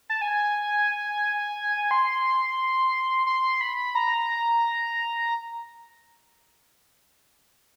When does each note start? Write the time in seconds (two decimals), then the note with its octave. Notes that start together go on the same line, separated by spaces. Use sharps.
0.10 A5
0.21 G#5
1.91 C6
3.27 C6
3.61 B5
3.95 A#5